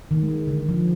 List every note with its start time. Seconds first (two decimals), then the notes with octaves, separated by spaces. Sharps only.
0.11 D#3
0.23 G#3
0.48 D3
0.69 F3